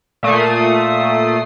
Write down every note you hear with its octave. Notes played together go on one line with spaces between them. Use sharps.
A#2 A3 D#6 C7